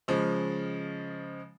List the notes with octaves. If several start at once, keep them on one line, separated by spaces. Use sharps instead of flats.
C#3 F3 G#3